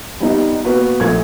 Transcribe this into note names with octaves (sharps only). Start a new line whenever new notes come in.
G3 B3 D#4
A#3 B3 F#4 B4
A#1 A3 G#6